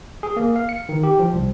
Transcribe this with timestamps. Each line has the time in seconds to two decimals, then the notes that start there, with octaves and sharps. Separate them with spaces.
0.23 G#4
0.37 A#3
0.56 F5
0.69 C#7
0.89 D#3
1.03 G4
1.19 F3
1.33 C2